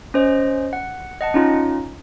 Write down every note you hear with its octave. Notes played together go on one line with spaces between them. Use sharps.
C#4 C5 D#5
F#5
D#5 F#5 A5
C#4 D#4 F4